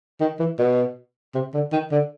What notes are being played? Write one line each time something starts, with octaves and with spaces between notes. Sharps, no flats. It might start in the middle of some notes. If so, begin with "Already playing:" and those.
D#3
E3
B2
C3
D3
D#3
D3